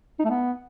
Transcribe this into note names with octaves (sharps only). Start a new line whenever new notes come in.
D#4
A3
B3